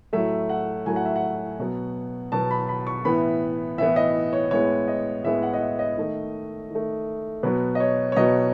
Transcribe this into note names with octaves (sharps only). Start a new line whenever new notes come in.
A2 F#3 A3 E5
F#5
A2 F#3 A3 G#5
F#5
E5
F#5
B2 F#3 B3
B2 F#3 B3 A5
B5
B5
C#6
A2 E3 B3 B5
A2 E3 B3 E5
D#5
C#5
A2 G#3 B3 C#5
D#5
A2 G#3 B3 E5
F#5
D#5
E5
D#5
D#3 A3
D#3
A3
B2 F#3 B3 B4
D#5
C#5
C#5
B2 F#3 B3 D#5